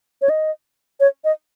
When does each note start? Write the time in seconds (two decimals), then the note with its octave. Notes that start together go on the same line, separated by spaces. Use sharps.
0.22 C#5
0.29 D#5
1.00 C#5
1.24 D#5